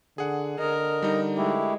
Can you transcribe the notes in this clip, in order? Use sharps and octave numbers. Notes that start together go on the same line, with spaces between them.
D3 G#4 F#5
D3 A#4 D#5
G3 D#4
G#3 A3 E4 G4